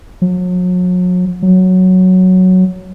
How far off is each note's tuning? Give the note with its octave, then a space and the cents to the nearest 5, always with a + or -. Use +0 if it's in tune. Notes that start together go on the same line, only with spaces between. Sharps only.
F#3 -40
F#3 +0